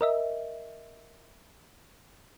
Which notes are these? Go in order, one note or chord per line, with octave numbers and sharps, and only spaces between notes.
A#4 D#5 E5